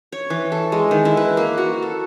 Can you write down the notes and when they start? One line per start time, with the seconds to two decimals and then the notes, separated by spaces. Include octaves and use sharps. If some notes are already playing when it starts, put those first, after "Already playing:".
0.12 C#5
0.30 E3
0.52 A4
0.72 G#3
0.91 D#3
1.05 E4
1.17 B4
1.37 A#3
1.58 F#4
1.82 A4